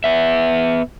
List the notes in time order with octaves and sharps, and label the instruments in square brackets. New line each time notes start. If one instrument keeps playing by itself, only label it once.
[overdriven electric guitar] B3 E5